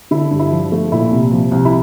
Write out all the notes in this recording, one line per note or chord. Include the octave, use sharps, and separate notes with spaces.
D3 E4
G2
E4
F3
A3
A#2 E4
C2
F3
C2
E4